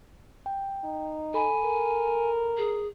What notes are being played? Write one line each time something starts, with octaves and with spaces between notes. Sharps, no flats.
G5
D#4
A4 G#5 B5
A#4
G#4